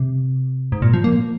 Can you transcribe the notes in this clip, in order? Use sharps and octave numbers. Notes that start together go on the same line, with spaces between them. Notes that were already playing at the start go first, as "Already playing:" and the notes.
Already playing: C3
G#2
A#2
F3
A#3